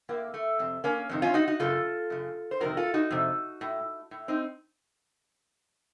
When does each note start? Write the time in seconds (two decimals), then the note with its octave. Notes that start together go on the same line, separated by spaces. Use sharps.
0.09 A2 A#3
0.34 A3
0.59 F2 C3
0.84 A#3 C#4
1.09 F2 C3 D#3
1.22 C#4 F4
1.34 D#4 F#4
1.48 D#4 F#4
1.60 F#2 C#3 F4 A4
2.10 F#2 C#3
2.51 C5
2.60 F2 C3 D#3 F#4 A#4
2.77 F4 A4
2.94 D#4 F#4
3.10 F2 C3
3.61 A2
4.11 A2
4.28 C4 D#4